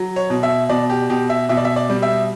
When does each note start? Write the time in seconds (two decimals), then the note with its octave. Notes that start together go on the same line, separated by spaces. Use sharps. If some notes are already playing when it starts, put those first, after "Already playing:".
Already playing: F#3
0.16 C#5
0.30 B2
0.43 E5
0.69 B2 D5
0.90 G4
1.09 B2 G4
1.29 E5
1.49 B2 E5
1.57 D5
1.65 E5
1.76 D5
1.90 G3
2.02 E5